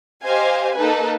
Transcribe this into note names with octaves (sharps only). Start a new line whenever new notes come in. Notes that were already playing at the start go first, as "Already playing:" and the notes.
G4 C5 D#5 F5 G#5
A#3 D#4 A4 B4